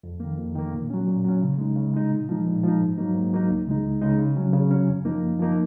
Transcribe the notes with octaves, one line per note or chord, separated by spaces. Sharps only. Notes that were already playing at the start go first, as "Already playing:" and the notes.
F2
D#3 A#3
F2
D#3 A#3
A#2
F#3 C#4
A#2
F#3 C#4
C#3
G#3 D#4
C#3
G#3 D#4
A#2
F3 G#3 D#4
A#2
F3 G#3 D#4
G#2
F#3 A#3 D#4
G#2
F#3 A#3 D#4
C#2
C#3 G#3 D#4
C#2
C#3 G#3 D#4
C#3
F#3 C#4
C#3
F#3 C#4
F#2
F3 A#3 D#4
F#2
F3 A#3 D#4